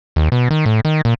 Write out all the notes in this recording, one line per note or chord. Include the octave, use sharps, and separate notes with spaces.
D#2
B2
D#3
A2
D#3
A#2